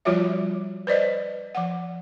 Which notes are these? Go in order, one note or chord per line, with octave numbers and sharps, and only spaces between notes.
F3 G3 F4 F#4 C#5 E5
B4 C5 D5 D#5
F3 F#5